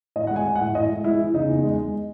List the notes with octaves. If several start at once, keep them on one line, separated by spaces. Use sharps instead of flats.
A2 D#5
G#3 F#5
G#5
G#3
F#5
A2
A2 D#5
G#3
G#3 E4
E3
C#3 D#4
E2
G#3
G#3